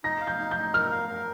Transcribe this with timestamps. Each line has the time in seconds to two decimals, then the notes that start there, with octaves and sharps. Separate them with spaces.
0.04 D#4 A#6
0.21 F5
0.27 G6
0.39 D#4
0.51 D#4 G6
0.74 A#4 F6
0.92 F5
1.08 A#4